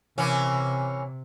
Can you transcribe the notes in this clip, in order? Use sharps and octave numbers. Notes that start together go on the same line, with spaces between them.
C3 E3 A#3 C#4